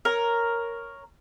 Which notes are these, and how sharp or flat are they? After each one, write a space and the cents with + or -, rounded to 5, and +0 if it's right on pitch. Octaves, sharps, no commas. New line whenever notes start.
A#4 +0 C#5 +0